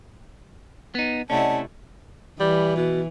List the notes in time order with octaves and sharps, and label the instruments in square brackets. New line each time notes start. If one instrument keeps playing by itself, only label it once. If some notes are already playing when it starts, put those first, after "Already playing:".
[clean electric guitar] B3 D#4
[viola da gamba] C3 A3 E4 [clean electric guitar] C#4 [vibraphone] D5 D#5 F#5 [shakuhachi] A5
[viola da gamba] E3 [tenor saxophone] G3
[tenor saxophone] B2